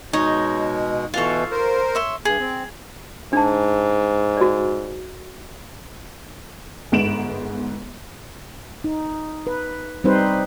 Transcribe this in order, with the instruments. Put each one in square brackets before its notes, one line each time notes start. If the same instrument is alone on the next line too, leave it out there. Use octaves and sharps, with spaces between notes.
[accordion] B2 G#3 [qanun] D#4 [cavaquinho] C#5
[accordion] B2 E3 [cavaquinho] F4 C#6 [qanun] A4 F5
[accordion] A#4 C5
[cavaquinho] C#5 E5 C6
[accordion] G2 [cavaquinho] G#4
[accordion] C4
[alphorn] G#2 [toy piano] D4 A5
[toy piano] F#4 D5
[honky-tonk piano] G1 G#2 B3 D7 E7 F#7
[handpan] D#4
B4
G3 C4 D#4 B4 C5